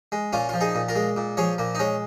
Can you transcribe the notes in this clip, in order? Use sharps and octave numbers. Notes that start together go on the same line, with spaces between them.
G#3
A#2 C#4 F4
F3 F4
D#4 G#4
A#2
F4 A#4
G#3
A#2
F3 G#4 C#5
A#2 A#3
D#4
G#3 C#4